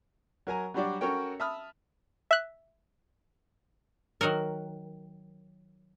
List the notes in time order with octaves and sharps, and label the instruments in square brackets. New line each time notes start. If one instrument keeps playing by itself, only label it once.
[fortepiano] F#3 A#4 G#5 A#5
F#3 G3 D4 F#4 G4 D5
C#4 F#4 A4 A#4 C#5 G5
E5 A5 B5 D#6 F6
[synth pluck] E5 F#6
[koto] D#3 F#3 F#4 A#4